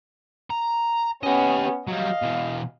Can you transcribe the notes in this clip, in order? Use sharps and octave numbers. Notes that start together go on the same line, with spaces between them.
A#5
B3 C#4 G4 D#5
F#3 G3 D#5 F5
B2 E3